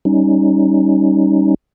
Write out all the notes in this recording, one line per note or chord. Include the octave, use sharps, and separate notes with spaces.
G3 C#4 D#4